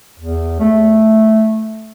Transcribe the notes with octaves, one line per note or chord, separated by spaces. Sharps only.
E2
A3